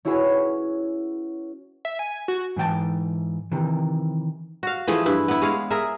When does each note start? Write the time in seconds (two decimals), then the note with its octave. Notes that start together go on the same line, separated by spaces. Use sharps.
0.05 C#4 E4 F#4 G#4 B4 C#5
1.85 E5
1.99 G#5
2.28 F#4
2.56 G#2 E3 G5 A5
3.52 C3 D#3 E3
4.63 F#4 F5
4.88 E3 F3 A3 G#4
5.06 G2 E4 B4
5.28 B3 E4
5.42 G#3 C#5 F5
5.71 G#4 A#4 E5